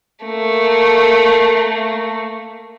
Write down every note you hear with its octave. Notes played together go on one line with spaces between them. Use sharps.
A3 A#3